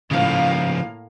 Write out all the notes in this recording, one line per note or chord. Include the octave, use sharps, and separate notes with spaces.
A2 C#3 F3 A#3 F5